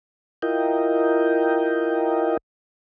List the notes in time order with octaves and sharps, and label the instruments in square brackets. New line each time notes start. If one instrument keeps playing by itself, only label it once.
[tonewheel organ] E4 F4 A#4 D#5 G5